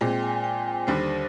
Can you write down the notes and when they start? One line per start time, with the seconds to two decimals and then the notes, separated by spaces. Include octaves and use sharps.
0.01 A#2 G#3 C4 G5
0.22 G#5
0.44 G5
0.87 D#2 D3 G3 C5